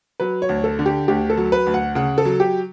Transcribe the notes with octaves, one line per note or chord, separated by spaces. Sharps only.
F#3 B4
C#5
D2
A4
D3
G4
D2 G4
A4
F#3
B4
D2
F#5
C#3 F#5
A4
F#3
G4